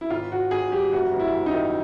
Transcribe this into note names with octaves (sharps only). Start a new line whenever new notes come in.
E4
G#1 F4
G#1 F#4
G#1 G#4
G3 G4
F#1 F#4
F#1
E4
F#1
D#4
D#3